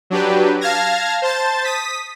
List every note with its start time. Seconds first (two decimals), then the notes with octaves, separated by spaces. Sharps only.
0.10 F#3 D4 G4 B4
0.61 F5 A5 F6 G#6 A#6
1.22 C5 A5 A6
1.64 D#6 B6